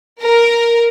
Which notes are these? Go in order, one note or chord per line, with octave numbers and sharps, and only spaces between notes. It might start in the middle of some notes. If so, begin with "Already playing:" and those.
A#4